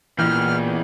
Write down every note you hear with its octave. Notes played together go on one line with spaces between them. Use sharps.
A1 E2 A#2 E3 F6 G6